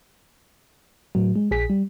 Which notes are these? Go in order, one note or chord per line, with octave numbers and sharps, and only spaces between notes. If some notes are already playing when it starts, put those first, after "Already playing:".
A2 F#3
G#3
A#1 G#4 B6
G3